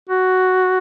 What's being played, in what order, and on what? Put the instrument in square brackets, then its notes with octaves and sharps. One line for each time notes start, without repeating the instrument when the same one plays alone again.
[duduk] F#4